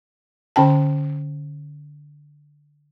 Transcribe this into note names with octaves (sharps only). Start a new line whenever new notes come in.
D3 C#4 G5 A5